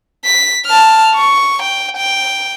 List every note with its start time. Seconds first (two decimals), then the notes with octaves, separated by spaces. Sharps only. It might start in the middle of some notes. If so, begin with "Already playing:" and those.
0.25 B6
0.66 A5 F6
1.14 C#6
1.62 G5
1.97 G5